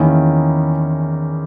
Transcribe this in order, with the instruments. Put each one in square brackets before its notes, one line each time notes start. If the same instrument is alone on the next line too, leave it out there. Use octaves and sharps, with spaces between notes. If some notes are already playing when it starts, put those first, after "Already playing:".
Already playing: [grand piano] E2 D#3 A#3 C#4 E4